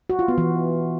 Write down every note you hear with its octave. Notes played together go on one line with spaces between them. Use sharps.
F#4
F4
B3
E3